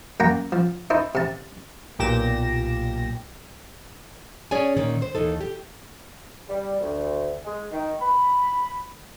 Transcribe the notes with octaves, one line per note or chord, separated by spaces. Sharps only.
F#2 A#3 F#5 G5 A#5
F3
D#4 E4 C5
C3 A5
B1 A#2 G4 D6 A#6 E7
C#4 G#4 C#5 D5 G#5
A#2 D#3 C#4
C5
D#2 E3 D#4 A4
G4
G3
D2
G#3
D#3
B5